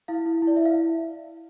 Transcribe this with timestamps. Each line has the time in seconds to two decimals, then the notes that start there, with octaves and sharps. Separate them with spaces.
0.08 E4 F5
0.26 E4
0.42 E4
0.47 D5
0.56 E4 E5
0.66 F5